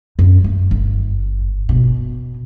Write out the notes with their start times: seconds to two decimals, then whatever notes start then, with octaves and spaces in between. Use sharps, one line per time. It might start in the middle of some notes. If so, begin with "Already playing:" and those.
0.19 F#2
0.44 A3
0.71 G1
1.69 B2